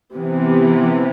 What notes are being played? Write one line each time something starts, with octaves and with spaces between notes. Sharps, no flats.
C3 E3 B3